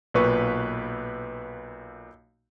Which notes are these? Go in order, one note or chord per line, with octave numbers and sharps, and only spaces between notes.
B1 A#2 B4 C#6